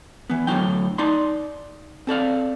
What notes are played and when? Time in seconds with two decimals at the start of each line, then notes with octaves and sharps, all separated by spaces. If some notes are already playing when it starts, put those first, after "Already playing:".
0.30 E3 B3
0.47 A2 D3 F#3 D#4 G5
0.98 D#4 D5 C6
2.07 C4 A4 D5 F5